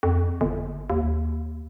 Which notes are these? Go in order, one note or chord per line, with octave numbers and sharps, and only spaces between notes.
F2
G1
D#2